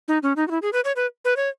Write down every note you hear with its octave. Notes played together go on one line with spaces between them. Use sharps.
D#4
C#4
D#4
F#4
E4
G#4
B4
C#5
B4
B4
C#5